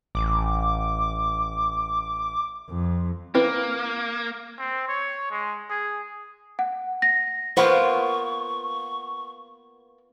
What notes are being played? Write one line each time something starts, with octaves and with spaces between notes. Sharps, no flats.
A1 D6
F2
A#3 C4 E4 B4
C4
C#5
G#3
G#4
F#5
A#6
A#3 B3 F4 C5 C#6